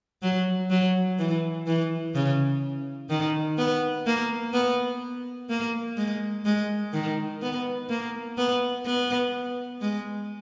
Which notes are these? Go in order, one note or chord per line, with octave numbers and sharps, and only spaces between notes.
F#3
F#3
E3
E3
C#3
D#3
B3
A#3
B3
A#3
G#3
G#3
D#3
B3
A#3
B3
B3
G#3